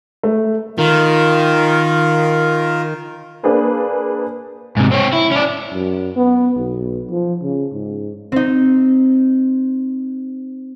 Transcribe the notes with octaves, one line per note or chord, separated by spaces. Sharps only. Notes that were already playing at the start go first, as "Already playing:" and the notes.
A3
D#3 F4 A#4
A#3 D4 G#4 B4 C5
G#2 C3
C4 C#5
E4
C#4 D5
F#2
B3
B1
F3
C#3
G#2
C4 D#4